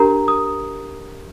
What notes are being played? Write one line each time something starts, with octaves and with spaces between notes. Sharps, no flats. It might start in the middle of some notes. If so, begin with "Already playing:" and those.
Already playing: D4 G4 A#4 A#5
D#6